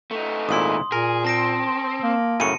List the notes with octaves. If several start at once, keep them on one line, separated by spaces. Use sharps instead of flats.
A3 D#4
G#1 A#2 E4 C6 D#6
A#2 G#4 A#4
C4 A5 A#6 D7
A#3
F#2 A2 C#3 C#7 D#7